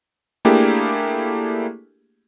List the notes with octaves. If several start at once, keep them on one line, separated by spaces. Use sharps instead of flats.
A3 A#3 D4 E4 G4 G#4